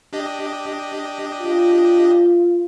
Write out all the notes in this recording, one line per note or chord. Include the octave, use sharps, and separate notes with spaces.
D4 G4 D#5
F4